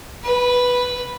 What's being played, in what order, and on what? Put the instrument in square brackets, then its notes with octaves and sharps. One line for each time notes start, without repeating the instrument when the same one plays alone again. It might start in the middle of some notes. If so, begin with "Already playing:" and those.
[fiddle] B4